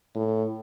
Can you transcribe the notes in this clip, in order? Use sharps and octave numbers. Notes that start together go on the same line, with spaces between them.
A2